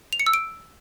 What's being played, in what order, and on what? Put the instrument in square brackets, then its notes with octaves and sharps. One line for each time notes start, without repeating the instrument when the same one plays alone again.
[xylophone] F7
C#7
E6
D7